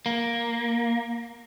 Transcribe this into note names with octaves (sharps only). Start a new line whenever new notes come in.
A#3